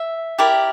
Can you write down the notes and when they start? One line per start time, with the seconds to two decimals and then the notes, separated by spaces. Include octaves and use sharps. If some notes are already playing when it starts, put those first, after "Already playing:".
Already playing: E5
0.38 E4 G4 A#4 D5